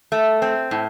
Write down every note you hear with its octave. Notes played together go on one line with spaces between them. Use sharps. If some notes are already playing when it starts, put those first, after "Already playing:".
A3
C4
A2